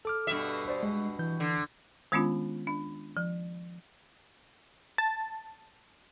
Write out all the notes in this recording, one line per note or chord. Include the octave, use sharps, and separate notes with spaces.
A4 D6 F6
G2 B2 E5
C5 D5
G#3
E3 G6
D3
D#3 G#3 B3 C#4 D4 F4
D4
F3
A5